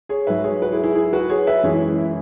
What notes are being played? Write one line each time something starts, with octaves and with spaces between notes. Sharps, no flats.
G#4 C#5
G#2 F#3 B4 E5
G#4 C#5
F#4 B4
E4 G#4
E4 G#4
E4 G#4
F#4 B4
G#4 C#5
B4 E5
F#2 E3 G#3 G#4 C#5
E4 G#4
E4